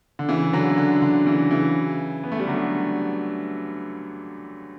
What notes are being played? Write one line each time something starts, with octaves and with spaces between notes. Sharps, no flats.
D3
C#3 E3
D3 F#3
D3
D3
C#3 E3
C#3 E3
B3
A3
G3
D3 F#3